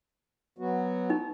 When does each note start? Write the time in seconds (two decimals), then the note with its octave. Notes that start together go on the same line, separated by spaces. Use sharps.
0.58 F#3 B3 F#4
1.10 D#4